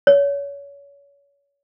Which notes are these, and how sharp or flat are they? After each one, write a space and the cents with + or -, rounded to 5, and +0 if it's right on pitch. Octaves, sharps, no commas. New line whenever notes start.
C#5 +30